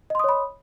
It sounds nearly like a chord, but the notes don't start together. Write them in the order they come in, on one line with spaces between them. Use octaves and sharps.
D#5 C6 D#6 C#5 B5